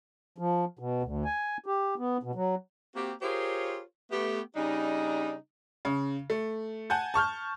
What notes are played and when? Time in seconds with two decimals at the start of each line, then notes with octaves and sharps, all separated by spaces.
0.38 F3
0.79 B2
1.03 D2
1.25 G#5
1.66 G4
1.98 B3
2.23 B2
2.35 F#3
2.96 A#3 C4 F#4 G4
3.22 F4 G4 G#4 A#4 C5 C#5
4.11 A3 B3 G4
4.56 C#3 G3 D4 D#4
5.85 C#3
6.30 A3
6.90 F#5 G#5 A5 G6
7.14 A5 C#6 F6 G6